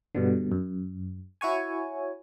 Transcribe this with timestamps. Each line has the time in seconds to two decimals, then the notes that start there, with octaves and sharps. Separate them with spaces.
0.15 G2 B2 D3
0.52 F#2
1.41 E4 F#4 C#5 G#5